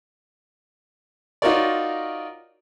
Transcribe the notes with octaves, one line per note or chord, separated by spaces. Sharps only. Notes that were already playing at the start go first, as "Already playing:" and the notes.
D#4 F4 F#4 A#4 C#5 D5